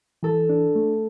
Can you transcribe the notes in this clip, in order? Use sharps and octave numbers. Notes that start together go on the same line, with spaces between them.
E3 A4
D4
A3